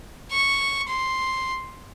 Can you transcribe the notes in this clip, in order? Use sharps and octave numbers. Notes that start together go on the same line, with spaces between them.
C#6
C6